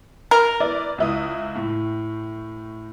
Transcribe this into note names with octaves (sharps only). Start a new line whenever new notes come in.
A#4
E4 B4 D5
C#2 E4 D#6
A2